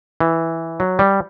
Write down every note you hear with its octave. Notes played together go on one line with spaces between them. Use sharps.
E3
F#3
G3